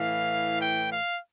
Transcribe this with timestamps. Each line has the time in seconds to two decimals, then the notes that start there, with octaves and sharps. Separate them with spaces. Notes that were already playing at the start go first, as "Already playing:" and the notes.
Already playing: A2 E3 F5
0.57 G5
0.90 F5